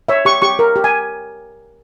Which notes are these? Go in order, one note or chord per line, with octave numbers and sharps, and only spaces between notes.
C#5 E5
G4 C#6
G4 C#6
A#4
G4
G#5